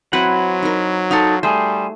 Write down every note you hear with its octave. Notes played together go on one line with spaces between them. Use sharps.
F#3 C4 E4 F#4 B4 F#5
D#4 A#4
D#4 F#4 A4 F5 C6
G3 A3 G#4 C5